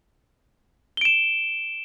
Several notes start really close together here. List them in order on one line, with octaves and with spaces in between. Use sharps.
G7 D7 E7